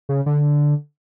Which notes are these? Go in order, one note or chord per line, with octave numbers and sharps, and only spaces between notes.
C#3
D3